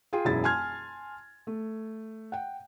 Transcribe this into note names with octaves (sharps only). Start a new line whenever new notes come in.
F4 G#4 G5
E1 F#2 E4 G#4 A6
G#5 A5 C6 F6 G#6
A3
F#5 G5